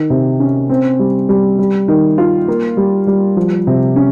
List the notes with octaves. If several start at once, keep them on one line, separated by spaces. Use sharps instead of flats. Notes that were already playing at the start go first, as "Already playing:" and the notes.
Already playing: D#3
C3
C#4
C4
G3
G3
G3
D#3
F4
A#3
G3
G3
F3
C3
C#4